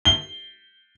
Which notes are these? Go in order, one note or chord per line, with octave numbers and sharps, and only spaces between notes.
G7